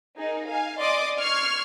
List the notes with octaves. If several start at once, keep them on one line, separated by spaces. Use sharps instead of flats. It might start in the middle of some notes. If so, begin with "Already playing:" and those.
D#4 G#4 A#4
F5 G#5
D5 D#5 C6 D6 D#6
C#6 F6 G#6 C7